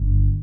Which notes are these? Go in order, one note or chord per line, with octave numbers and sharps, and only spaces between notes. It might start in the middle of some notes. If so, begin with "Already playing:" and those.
Already playing: G1